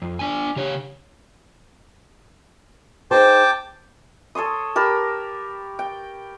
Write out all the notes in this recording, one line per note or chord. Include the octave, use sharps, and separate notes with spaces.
F2
D4 G#5
C#3 G4 C#5
D#4 G#4 C5 G5 A5 D6
A4 C#5 C6 D#6
G4 A#4 A5 B5
G5